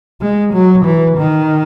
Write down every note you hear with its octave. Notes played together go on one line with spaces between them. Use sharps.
G#3
F#3
E3
D#3